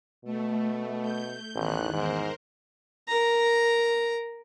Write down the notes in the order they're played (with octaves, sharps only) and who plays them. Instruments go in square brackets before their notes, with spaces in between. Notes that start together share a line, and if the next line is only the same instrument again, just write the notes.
[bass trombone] B2 [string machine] A3
[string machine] G6
[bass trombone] A1 [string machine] E2 D#3 F#6
[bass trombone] G#2 [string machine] A#4 C5
[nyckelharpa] A#4 A#5